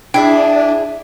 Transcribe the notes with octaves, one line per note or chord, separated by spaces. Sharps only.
D4 E4 G#4 E5 G5